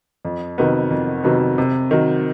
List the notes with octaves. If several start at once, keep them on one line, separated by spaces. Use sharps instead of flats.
F2
C3 D#3 F#3 B3
F2
C3 D#3 F#3 B3
C3
D#3 F#3